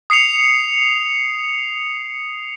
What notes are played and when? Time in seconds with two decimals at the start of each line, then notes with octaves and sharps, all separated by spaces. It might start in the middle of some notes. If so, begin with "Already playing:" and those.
0.10 D#6 C7 C#7 F7